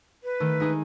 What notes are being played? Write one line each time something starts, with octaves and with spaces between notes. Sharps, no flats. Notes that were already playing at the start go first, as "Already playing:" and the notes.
B4
D#3 A3
G#3 D#4 G#4